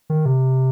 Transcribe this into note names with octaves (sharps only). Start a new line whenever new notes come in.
D#3
C3